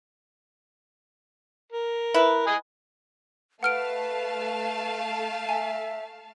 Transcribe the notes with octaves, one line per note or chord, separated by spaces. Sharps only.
A#4
E4 B4
D#5 G#5
A3 B4 F5 F#5 A5 F6 D7
E5 G#5